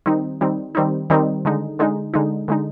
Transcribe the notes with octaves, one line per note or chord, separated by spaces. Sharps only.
D#3 G3 C4 D#4
D#3 G3 C4 D#4
D#3 G3 C4 D#4
D#3 G3 C4 D#4
D3 G#3 D#4
D3 G#3 D#4
D3 G#3 D#4
D3 G#3 D#4